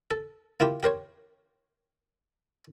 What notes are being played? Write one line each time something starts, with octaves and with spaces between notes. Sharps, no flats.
A4
A#3 E4 F4 G4
G4 A#4 C5 C#5